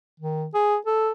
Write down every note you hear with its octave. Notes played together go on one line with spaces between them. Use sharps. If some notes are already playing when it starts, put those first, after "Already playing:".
D#3
G#4
A4